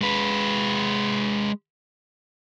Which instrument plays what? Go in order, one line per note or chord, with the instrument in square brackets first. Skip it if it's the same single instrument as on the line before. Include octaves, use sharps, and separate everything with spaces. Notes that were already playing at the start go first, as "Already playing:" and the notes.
[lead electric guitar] G#3 B4